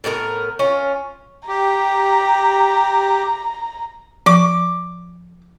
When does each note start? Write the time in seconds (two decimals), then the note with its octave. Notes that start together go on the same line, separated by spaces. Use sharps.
0.04 A2 B3 F4 A#4
0.59 C#4 F4
1.48 G4 A#5
4.26 F3 D6